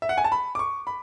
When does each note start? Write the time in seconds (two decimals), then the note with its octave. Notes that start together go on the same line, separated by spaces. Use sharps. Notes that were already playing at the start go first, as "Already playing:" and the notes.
0.02 E5
0.09 F#5
0.18 G#5
0.24 A5
0.32 B5
0.55 D6
0.59 C#6
0.87 B5